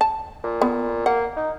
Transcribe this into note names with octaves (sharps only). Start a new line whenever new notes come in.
A5
A#2
B3
A#3 F#5
D#4